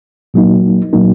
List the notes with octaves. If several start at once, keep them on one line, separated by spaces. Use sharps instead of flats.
A#2 F#3 A#3 D#4
A#2 F#3 A#3 D#4